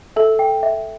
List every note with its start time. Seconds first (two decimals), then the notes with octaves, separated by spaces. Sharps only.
0.16 A4 E5
0.39 G5
0.63 E5